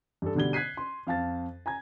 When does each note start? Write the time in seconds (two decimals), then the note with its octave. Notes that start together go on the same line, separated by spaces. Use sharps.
0.22 G2 A4
0.35 B2 D3 G3 G#6 G7
0.53 F#6 G#6 B6 C7 D#7
0.77 C6
1.07 F2 F5 A5 A6
1.66 G#5 A#5 G#6